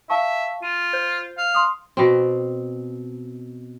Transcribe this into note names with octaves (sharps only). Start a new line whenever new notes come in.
E5 F5 A5 C#6
F4 D#7
C5 G6
F5
C6 D#6
B2 C4